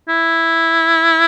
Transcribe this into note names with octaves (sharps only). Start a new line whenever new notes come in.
E4